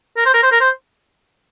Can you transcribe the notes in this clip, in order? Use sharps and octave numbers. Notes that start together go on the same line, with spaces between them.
A#4
C5
A#4
C5
A#4
C5